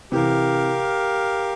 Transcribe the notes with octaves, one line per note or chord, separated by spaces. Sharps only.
C3 E3 G4 A#4 F5